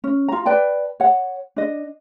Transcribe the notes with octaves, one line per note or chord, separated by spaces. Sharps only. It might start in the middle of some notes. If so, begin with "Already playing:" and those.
C#4
F4 A#5
B4 D5 G5 A5
C#5 F#5
D4 D#5